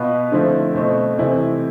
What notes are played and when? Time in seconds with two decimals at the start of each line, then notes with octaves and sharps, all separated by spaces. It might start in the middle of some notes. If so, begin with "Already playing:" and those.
Already playing: B2 B3 F4 B4
0.31 D3 F3 A3 C4 E4
0.75 B2 A3 C4
1.18 C3 E3 A3 C4 E4